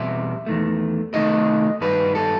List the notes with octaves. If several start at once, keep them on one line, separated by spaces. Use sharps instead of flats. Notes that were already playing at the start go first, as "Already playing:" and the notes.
Already playing: E2 B2 G3 C4 E5
E2 D#3 A3
C3 D#3 A3 D#4 D#5
G2 D#3 G3 B4
A4